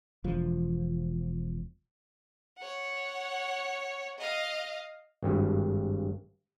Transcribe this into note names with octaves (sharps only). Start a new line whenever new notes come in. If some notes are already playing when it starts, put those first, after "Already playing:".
E1 F3
C#5 F#5
D#5 F5
G#1 G2